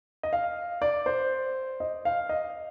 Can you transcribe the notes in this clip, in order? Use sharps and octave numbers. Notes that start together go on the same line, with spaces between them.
D#5
F5
D5
C5
D#5
F5
D#5